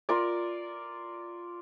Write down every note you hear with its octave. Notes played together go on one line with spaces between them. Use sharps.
F4 A#4 D5